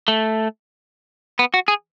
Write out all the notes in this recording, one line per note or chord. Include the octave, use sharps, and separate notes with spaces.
A3
B3
F#4
G#4